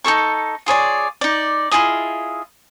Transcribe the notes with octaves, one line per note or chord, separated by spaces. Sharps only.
D#4 G#4 A4 C#6
F4 G#4 C#5 D5
D#4 D5
E4 F4 G#4 D#5